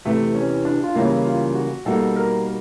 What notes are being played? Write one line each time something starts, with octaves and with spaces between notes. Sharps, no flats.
E2 C3 E3 A3
C#4
D4
F4
C#3 E3 G3 A#3 E4
F4
F#4
B2 G3 A#3 D#4 F#4 A4
A#4